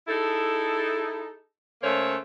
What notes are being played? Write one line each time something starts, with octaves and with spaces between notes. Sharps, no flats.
D#4 E4 G#4 A4
C#3 A3 A#3 C5 C#5